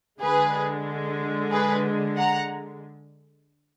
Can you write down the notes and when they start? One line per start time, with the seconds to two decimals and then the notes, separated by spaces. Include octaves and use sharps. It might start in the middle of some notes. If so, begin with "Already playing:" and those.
0.21 D3 G#3 G#4 B4
1.51 G#4 B4
2.17 F#5 A#5